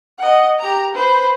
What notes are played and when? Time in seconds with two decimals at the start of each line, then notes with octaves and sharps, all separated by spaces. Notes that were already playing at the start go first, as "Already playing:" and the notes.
0.18 D#5 F#5
0.59 G4 A#5
0.94 B4 C5